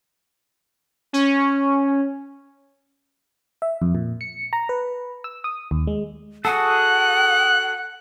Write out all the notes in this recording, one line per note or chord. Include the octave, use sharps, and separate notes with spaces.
C#4
E5
F2
A#2
C#7
A#5
B4
E6
D#6
D#2
G#3
F#4 G#4 A4 F#5 F#6